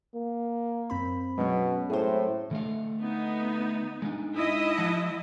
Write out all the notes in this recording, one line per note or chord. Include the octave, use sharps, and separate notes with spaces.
A#3
F#2 C4 B5
B2 F#3 G#3 C#4
A2 G#4 C5
D3 A3 F5
B3 D#4
G#3 D4 D#4
E4 D#5
F3 F#5 A5